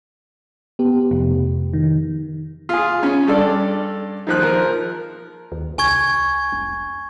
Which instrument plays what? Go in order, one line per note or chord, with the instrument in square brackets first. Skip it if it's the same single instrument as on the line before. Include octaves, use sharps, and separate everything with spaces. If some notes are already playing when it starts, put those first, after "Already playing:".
[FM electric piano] B3 G4
[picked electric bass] F1
[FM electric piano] D#3
[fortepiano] F4 G#4
C#4
G2 A4 D5
D#3 F3 F#6
F3 A#4
[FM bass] D#2
[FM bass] C2 [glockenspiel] G#5 C#6 G#6
[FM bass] F1